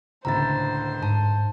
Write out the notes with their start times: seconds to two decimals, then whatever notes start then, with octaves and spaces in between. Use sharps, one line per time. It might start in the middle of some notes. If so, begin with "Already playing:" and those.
0.25 C#2 A2 D3 C5 A#5 A6
1.03 G#2 A5